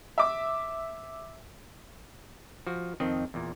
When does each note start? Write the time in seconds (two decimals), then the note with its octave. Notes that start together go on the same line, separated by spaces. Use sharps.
0.18 E5 D6
2.67 F3 F#4
3.00 F2 D#3 C4 D#5
3.34 E2 A#2